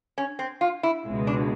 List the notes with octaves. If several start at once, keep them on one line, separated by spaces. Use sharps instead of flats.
C#4
C4
F4
E4
C#2 B2 G#3
D4